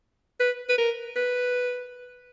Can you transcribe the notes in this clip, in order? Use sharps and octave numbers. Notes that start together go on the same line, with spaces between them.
B4
B4
A#4
B4